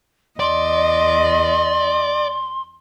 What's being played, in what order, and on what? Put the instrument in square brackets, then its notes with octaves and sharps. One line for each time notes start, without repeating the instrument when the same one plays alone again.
[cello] E2 D#5 [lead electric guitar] D5 [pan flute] C6